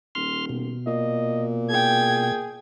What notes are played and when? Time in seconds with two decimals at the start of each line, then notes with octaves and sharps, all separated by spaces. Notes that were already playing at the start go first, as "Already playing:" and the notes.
0.15 D#1 C6 F6
0.49 B2
0.87 A#2 D#5
1.70 G#4 G5 G#6